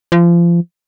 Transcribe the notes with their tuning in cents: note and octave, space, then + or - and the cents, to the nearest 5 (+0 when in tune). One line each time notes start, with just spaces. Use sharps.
F3 -30